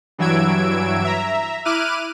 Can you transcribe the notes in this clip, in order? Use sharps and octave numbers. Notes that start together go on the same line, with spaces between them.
G2 E3 F#3 E6 G#6 D7
E5 A#5
E4 D6 F6 F#6 D#7